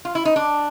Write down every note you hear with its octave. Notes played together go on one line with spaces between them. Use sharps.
F4
E4
D#4
D4